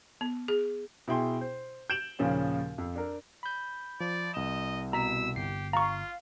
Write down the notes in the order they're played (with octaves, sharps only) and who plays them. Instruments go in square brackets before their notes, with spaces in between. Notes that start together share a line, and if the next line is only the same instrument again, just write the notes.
[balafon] B3
G#4
[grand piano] B2 E4 G#4 G5 C6
C5
G6 D7 E7 F#7
D#2 A#2 C#3 F3 C#4
F2
D4 A#4
[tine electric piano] B5 G6
[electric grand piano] F3 [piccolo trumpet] D5
[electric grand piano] C2 E7 [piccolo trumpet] D#5
[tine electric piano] B2 B6 [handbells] A#5 [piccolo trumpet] E6
[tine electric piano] G1 C7 [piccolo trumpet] G4
[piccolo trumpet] F4 [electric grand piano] F5 [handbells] A#5 C#6